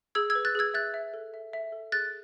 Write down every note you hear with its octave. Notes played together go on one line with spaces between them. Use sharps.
G#4 E6 G#6
E6 G#6
B4
F#6 A6
G#4 E6 G#6
E5 F#6 A6
E5
A4
E5
E5
A4
G#4 F#6 A6